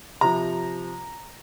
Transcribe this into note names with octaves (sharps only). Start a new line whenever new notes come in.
C3 F3 A#5